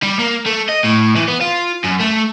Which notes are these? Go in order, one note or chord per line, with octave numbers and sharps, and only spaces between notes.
G3
A#3
A3
D#5
A2
E3
B3
F4
F#2
A3